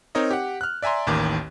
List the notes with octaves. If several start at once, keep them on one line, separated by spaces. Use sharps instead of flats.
C4 D#4 A#4 C#5 D#5
G4 F#5
F6 F#6
D5 E5 G#5 A#5 C6
A1 D#2 D#3 D6